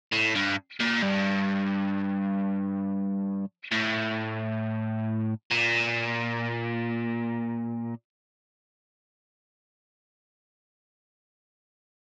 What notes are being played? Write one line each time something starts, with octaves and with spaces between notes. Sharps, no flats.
A2
G2
A#2
G2
A2
A#2